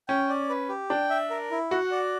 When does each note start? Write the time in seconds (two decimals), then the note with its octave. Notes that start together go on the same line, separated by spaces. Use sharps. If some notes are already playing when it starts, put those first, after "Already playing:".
0.08 C#4 G5
0.29 D5
0.49 B4
0.69 G4
0.90 D4 G5
1.10 E5
1.30 A#4
1.51 E4
1.70 F#4 F#5
1.91 D5